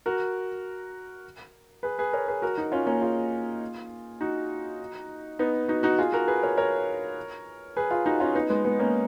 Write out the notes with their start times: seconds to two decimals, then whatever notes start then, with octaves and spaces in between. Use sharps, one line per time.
0.06 F#4 A#4
1.83 G#4 B4
1.98 G#4 B4
2.13 A#4 C#5
2.28 G#4 B4
2.42 F#4 A#4
2.58 D#4 F#4
2.72 C#4 F4
2.87 A#3 C#4
3.02 F4 G#4
4.21 D#4 F#4
5.39 B3 D#4
5.68 D#4 F#4
5.83 D#4 F#4
5.98 F4 G#4
6.13 F#4 A#4
6.28 G#4 B4
6.43 A#4 C#5
6.57 A#4 C#5
7.77 G#4 B4
7.90 F4 G#4
8.06 D#4 F#4
8.20 C#4 F4
8.35 B3 D#4
8.49 G#3 B3
8.65 G#3 B3
8.79 A#3 C#4